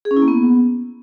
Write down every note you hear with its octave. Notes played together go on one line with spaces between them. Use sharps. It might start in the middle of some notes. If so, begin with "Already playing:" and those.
G#4
C#4
E4
A#3
B3